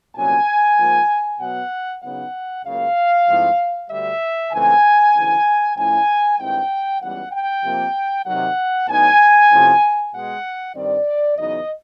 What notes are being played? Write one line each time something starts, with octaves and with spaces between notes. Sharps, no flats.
C2 A#2 F#3 A#3 C#4 G#5
G#2 F3 A#3
B2 F#3 B3 F#5
C#3 F#3 B3 D#4 F#5
C#2 C#3 F#3 A#3 F5
G#2 F3 A3 C4 E4
D2 D3 G3 E5
C#2 C#3 E3 A3 C4 G#5
D2 C#3 E3
A2 F3 A3 C#4 E4 G#5
G2 D#3 G#3 C4 E4 G5
C#2 C#3 E3 G3 B3 F#5
G5
C3 F3 A#3
C3 D#3 F#3 F#5
A2 F#3 B3 D#4 G#5
C3 F3 A3 C#4 E4
B2 G#3 B3 F#5
G2 D#3 G3 C4 D5
E2 C#3 F#3 B3 D#4 D#5